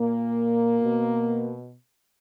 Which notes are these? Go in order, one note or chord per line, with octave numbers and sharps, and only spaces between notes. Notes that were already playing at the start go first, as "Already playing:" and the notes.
Already playing: A#2 A#3
B2